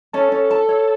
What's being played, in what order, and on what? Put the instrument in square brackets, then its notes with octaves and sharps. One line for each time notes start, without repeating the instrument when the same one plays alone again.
[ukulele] C#4 [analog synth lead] A4
[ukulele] C#4
A5
C#5